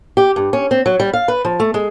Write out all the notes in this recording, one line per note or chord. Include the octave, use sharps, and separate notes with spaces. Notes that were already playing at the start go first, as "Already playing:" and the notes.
G4
G2
C#4
C4
F#3
G3
F5
B4
F3
A3
G#3